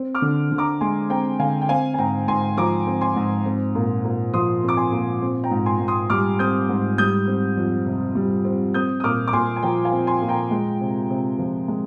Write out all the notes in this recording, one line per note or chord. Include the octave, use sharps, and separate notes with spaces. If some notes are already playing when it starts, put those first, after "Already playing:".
Already playing: C4
D6 F6
D3
D3
A#5 D6
G#3 G#5 C6
C4 G5 A#5
D3 F5 G#5
G5
C4 F5 G#5
G#5
G#2 G5 A#5
G#2 G#5 C6
F3 A#5 D6
C4
G#5 C6
G#2
C4
A#2
A#2
F3 C6 D#6
C4
D6
G#5 C6
A#2
C4
G5 A#5
G#2
G#5 C6
G#2
C6 D#6
G3 D6 F6
C4 D#6 G6
G#2
G3 D#6 G6
C4
F2
C3
G3
C4
C4 D#6 G6
D#6
A#2 D6 F6
D6
A#2 G#5 C6
G#5
F3 G5 A#5
F5 G#5
C4
G#5 C6
A#2
G5 A#5
G#3
C3
C3
F3
G#3